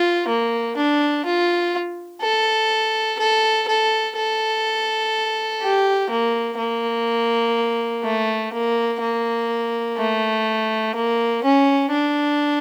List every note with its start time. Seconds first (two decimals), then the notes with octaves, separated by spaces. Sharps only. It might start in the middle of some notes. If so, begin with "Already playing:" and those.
Already playing: F4
0.28 A#3
0.77 D4
1.25 F4
2.22 A4
3.19 A4
3.68 A4
4.16 A4
5.62 G4
6.10 A#3
6.58 A#3
8.03 A3
8.53 A#3
9.01 A#3
9.98 A3
10.95 A#3
11.44 C#4
11.91 D4